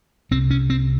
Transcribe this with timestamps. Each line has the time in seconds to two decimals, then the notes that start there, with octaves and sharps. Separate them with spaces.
0.31 C2 C3 C4
0.51 C#4
0.70 C4